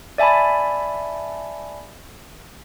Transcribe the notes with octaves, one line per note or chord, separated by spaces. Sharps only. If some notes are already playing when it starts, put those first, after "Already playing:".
D5 E5 G#5 A5 B5